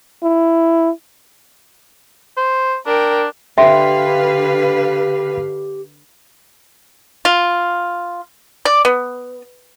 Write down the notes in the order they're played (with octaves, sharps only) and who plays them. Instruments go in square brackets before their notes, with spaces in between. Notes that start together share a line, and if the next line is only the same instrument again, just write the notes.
[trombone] E4
[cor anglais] C5
[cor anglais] D4 [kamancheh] A#4 G5
[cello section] D3 B4 F5 [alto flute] G4 [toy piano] E5 [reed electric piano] G5 C6
[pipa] F4
D5
B3